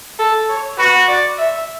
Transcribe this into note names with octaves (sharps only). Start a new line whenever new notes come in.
A4
C#5
F#4 B4
D5
E5